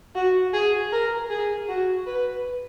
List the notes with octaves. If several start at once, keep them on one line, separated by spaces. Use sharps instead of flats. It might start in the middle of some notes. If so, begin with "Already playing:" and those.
F#4
G#4
A#4
G#4
F#4
B4